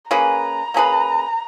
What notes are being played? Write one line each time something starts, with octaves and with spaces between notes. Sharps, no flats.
A#3 C#4 G#4 B4 A#5
A#3 C#4 G#4 B4